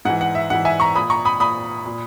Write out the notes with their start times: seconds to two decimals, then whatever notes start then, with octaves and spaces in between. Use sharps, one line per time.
0.05 G#2 E3 F#5
0.21 F#5
0.35 E5
0.50 G#2 E3 F#5
0.65 E5 G#5
0.80 A#5 C#6
0.96 A#2 B5 D#6
1.10 A#5 C#6
1.25 B5 D#6
1.40 A#2 B5 D#6
1.86 A#2